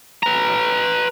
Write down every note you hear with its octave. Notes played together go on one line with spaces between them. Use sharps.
B4 A#5